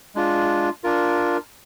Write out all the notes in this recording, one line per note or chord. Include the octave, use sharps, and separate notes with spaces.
G#3 D4 F4
D4 F4 A#4